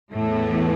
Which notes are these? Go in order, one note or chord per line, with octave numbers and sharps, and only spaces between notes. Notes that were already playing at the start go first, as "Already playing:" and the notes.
E2 A2 E3 A3 B3